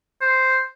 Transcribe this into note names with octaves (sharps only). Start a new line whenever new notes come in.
C5